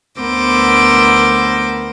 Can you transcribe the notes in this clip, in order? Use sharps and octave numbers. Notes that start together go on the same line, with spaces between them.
D2 B3 A#4 C5 D6 E6